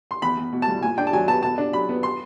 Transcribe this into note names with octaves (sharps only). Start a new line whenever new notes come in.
C6
E2 B5
E2
B2
A5
G3
A#2 G#5
D4 G5
A5
F#3 G#5
B3 A5
B2 A5
D4
F#3 B5
B3
C6